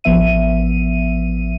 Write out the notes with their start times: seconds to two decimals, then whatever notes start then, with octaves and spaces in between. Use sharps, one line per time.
0.04 A1 F3 B3 E5 D#7